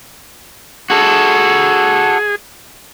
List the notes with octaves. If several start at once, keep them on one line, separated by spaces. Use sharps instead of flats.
F#4 G#4 A4